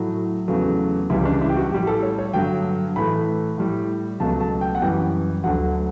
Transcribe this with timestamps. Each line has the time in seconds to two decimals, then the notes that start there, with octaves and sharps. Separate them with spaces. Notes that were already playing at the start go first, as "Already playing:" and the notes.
Already playing: A2 F#3 A3
0.48 E2 C#3 F#3 A3
1.10 C#2 C#3 E3 G3 E4
1.25 D4
1.41 E4
1.49 G4
1.56 F#4
1.72 A2 G4
1.74 G3
1.87 A4
2.03 C#5
2.19 C#5
2.33 G2 D3 F#3 G5
2.96 A2 E3 A3 B5
3.58 A2 G3
4.20 C#2 B2 F#3 A3 A5
4.41 A5
4.61 G5
4.75 F#5
4.82 F#2 E3 G3 G5
5.44 D2 D3 F#3 F#5